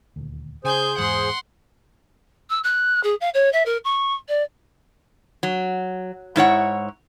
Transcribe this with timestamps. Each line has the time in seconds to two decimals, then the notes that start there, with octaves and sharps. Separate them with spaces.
0.16 D#1 D2
0.64 C#3 G#4 C5 G#5 G6
0.98 E2 G#2 F#5 C6
2.50 E6
2.64 F#6
3.03 G#4
3.21 F5
3.34 C#5
3.53 E5
3.66 A#4
3.84 C#6
4.28 D5
5.43 F#3
6.36 G#2 E4 C#5 F#5